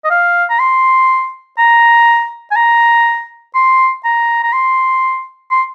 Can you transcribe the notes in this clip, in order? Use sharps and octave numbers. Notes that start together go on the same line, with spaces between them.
D#5
F5
A#5
C6
A#5
G#5
A#5
C6
A#5
A#5
C6
C6